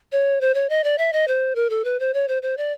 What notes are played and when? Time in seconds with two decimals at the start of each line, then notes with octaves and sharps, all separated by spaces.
0.12 C#5
0.41 C5
0.54 C#5
0.69 D#5
0.84 D5
0.98 E5
1.13 D#5
1.28 C5
1.55 A#4
1.70 A4
1.85 B4
2.00 C5
2.14 C#5
2.28 C5
2.42 C5
2.57 D5